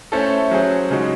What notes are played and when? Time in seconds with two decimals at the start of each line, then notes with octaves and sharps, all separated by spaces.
0.12 A3 C#4 E4 A4 C5
0.51 F#3 C#4 G#4 C5
0.90 C#3 G#3 D#4 F#4